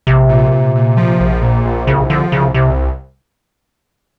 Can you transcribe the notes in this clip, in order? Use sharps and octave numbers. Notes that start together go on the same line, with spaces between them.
A#1 C3
A#2
A#2
A#2
F3
A#1
A#2
A#1
C2 C#3
D3 F3
C2 C#3
C2 C3